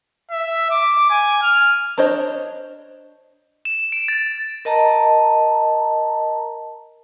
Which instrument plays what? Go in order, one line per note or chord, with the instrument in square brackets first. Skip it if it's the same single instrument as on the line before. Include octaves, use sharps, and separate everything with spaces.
[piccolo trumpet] E5
D6
G#5
F6
[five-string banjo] D4 C5 C#5 D#5
[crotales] E7
D7
A6
[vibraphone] A#4 D#5 A5 A#5